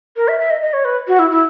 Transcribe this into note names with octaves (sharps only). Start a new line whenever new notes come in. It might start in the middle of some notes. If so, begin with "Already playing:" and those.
A#4
E5
E5
D#5
D#5
C#5
B4
F#4
E4
E4